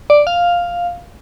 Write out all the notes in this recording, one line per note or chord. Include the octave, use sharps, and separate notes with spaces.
D5
F5